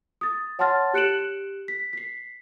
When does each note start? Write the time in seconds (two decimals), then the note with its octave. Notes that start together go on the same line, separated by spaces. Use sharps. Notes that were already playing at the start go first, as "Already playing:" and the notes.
0.21 D#6 A6
0.59 C#5 F#5 A5 C6 F6 A6
0.93 G4 F#6 C#7 D7 E7 F#7
1.68 B6
1.93 B6 C7